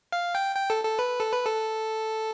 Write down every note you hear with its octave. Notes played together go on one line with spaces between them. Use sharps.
F5
G5
G5
A4
A4
B4
A4
B4
A4